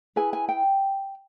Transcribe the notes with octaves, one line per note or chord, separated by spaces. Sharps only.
E4 G#4 B4 G#5
G#5
G5